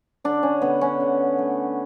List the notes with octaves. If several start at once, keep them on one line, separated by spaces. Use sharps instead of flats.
D3 D4
C#4
D3 B3
C#4
D3
A3